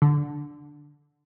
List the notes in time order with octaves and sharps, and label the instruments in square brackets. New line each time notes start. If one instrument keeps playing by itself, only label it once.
[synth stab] D3